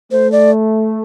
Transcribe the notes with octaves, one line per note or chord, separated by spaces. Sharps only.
A3 C5
D5